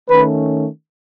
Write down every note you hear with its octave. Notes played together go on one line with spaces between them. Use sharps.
D#3 A3 C#4 B4